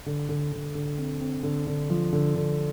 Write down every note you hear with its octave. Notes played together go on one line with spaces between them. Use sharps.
D3
D3
D3
D3
C4
C4
D3
D3
F3
D3
D3